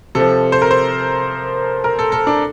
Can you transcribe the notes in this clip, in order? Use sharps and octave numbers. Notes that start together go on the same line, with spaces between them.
C3 F3 A4
C5
A#4
C5
A#4
A4
A4
D4